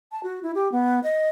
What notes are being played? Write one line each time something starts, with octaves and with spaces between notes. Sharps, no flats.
A5
F#4
E4
G4
B3
D#5